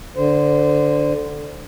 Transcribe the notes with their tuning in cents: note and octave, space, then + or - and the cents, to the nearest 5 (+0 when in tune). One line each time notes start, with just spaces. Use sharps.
D3 +0 C5 -20